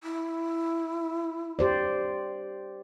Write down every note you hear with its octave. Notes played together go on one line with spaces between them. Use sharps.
E4
G4 C5 D5